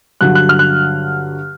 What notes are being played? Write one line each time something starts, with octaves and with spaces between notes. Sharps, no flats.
G2 D3 F#3 F#6
F#6
F6
F#6